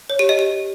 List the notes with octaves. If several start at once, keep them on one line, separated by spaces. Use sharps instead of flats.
C#5
G4
D#5
G4